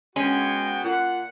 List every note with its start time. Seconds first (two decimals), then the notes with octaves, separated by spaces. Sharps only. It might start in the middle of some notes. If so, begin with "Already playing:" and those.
0.16 G#3 B3 C#4 F#4 G5
0.83 A#2 F#5